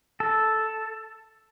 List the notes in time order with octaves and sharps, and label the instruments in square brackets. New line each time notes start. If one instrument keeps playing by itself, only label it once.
[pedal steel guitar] A4